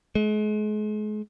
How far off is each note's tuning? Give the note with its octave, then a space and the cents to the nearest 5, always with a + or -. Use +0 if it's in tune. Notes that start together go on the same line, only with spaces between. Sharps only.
G#3 +35